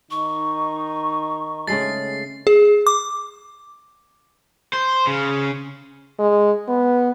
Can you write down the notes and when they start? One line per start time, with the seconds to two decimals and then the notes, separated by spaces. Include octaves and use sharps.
0.11 D#3 D#4 C#6
1.67 C#3 G#3 A3 A6 C7
2.47 G#4
2.87 D6
4.73 C5
5.07 C#3
6.19 G#3
6.68 B3